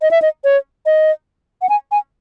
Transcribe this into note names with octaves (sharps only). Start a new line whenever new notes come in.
D#5
E5
D#5
C#5
D#5
F#5
G#5
G#5